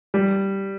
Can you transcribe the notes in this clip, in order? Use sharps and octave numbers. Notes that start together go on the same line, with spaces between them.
G3